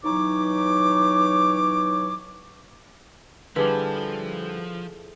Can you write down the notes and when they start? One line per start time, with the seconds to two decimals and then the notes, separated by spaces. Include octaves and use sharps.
0.04 B2 E3 F#3 D#4 C#5 D6
3.56 D3 F3 G3 E4 G#4 A4 B4 D6